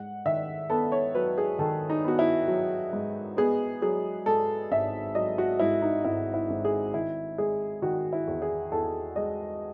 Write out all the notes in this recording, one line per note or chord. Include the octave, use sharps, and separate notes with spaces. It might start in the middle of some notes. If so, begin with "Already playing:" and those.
Already playing: G#2 F#5
D#3 E5
B3 A4
C#5
F#3 B4
G#4
D#3 A4
D#4
B3 F#4
E4
F#3
G#2
B3 G#4
F#3 G#4
G#2 A4
G#1 E5
F#3 D#5
F#4
G#2 E4
D#4
G#1 E4
E4
G#1
G#4
D#3 E4
G#3 G#4
D#3 F#4
E4
E2
G#4
E2 A4
G#3 D#5